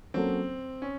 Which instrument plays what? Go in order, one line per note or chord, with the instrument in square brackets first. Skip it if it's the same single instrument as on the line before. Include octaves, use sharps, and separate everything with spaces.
[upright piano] F#3 A#3 C#4 F#4 A4 [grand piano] C4
[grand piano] C#4